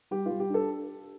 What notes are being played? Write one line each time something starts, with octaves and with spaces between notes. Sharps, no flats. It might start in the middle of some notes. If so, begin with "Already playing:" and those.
G3 G4
G3 F4
G4
D4 A4